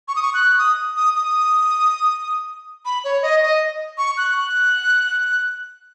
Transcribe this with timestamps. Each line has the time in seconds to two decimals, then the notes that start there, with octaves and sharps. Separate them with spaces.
0.08 C#6
0.16 D#6
0.23 C#6
0.34 F#6
0.59 D#6
0.97 D#6
1.15 D#6
2.85 B5
3.04 C#5
3.22 D#5
3.43 D#5
3.98 C#6
4.18 F#6